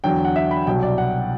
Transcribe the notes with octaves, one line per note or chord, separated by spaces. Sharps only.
E2 D3 F#3 G5
F#5
E5
B5
C2 B2 F#3 G5
D5
F#5